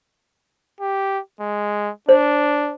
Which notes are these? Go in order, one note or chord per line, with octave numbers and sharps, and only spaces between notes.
G4
G#3
D4 C5